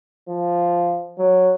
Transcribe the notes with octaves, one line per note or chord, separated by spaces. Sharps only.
F3
F#3